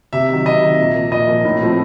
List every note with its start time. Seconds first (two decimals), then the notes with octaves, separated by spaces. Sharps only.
0.13 C3 E5
0.29 D#3 F#3
0.45 C3 D#5
0.62 D#3 F#3
0.78 A#2
0.95 F3 A#3
1.12 A#2 D#5
1.28 F3 A#3
1.45 A2
1.61 F3 A3 C4